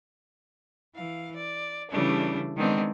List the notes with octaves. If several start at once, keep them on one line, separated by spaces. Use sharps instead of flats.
E3 F5
D5
C#3 E3 G3 A3 D4
D#3 G#3 B3 C4 D4 D#4